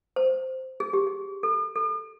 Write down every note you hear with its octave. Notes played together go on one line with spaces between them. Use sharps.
C5
G#4
G4
G#4
A4
A4